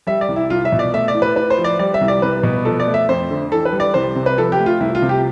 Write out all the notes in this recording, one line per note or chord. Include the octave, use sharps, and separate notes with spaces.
G3 E5
D5
C2
E4
C2 F4
E5
B2
D5
A3 E5
D5
A2
B4
A2 B4
C5
F3
D5
G3 D5
E5
C2
D5
C2 B4
B2
F3 A4
D5
A3
E5
F2 C5
D3
E3 A4
B4
G3
D5
C2 C5
C3
B4
F3 A4
G4
A3
F4
C2 E4
F4
C3
G4